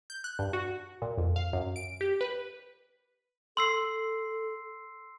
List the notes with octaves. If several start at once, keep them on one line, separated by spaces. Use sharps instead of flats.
G6
F#6
G2
F#4
A#2
F2
F5
F#2
D7
G4
B4
A4 C6 E6 C7